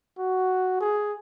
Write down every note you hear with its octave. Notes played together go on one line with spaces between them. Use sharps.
F#4
G#4